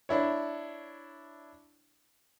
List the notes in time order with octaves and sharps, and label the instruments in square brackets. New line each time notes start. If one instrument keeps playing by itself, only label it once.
[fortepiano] D4 E4 C#5